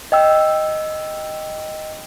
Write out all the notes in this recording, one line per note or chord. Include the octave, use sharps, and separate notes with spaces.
D#5 G5 E6